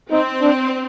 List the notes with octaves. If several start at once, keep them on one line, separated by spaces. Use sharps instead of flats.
C4 D#4
D4